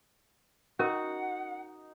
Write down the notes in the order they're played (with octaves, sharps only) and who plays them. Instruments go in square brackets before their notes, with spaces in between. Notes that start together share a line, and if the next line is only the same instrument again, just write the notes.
[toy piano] C#4 A#4 [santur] D#4 [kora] F#4 [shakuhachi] F#5